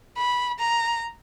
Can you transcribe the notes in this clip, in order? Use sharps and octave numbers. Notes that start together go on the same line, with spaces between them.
B5
A#5